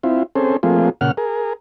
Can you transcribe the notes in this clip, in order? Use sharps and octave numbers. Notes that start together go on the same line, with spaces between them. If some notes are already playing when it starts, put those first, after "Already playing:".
C4 E4 F4
C4 C#4 G#4 A4 C5
F3 A3 A#3 C4 F4 G#4
A#2 C#3 F#5 F6
G#4 A#4